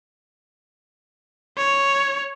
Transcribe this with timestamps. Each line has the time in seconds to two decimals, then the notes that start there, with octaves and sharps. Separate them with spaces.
1.57 C#5